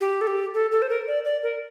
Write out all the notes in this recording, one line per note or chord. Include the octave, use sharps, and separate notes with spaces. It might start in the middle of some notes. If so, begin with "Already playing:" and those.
G4
A4
G4
A4
A4
C5
A#4
D5
D5
A#4